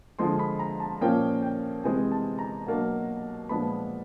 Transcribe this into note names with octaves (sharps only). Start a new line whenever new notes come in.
D3 F3 G#3 C6
B5
A#5
A5
A#2 F3 A#3 C#4 G5
G5
C3 E3 G#3 C4 G#5
A5
A#5
B2 F#3 A#3 D4
A#2 F3 G#3 B3 D4 B5